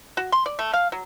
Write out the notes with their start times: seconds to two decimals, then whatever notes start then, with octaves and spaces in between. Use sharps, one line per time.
0.17 F#4
0.32 C6
0.46 D5
0.59 A3
0.73 F5
0.92 F#3